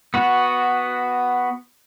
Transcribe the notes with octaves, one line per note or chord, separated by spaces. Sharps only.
B3 F#4